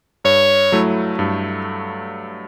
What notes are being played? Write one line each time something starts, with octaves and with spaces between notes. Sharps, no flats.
G2 C#5
F#3 A3 E4
G2